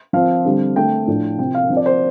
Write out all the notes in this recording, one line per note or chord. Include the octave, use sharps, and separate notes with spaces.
F3 C4 F5
D3 G3 C4
D3 A3 C4 G5
A2 F3 D4
C3 F3 C4 G5
F5
F3 C4
D5
C5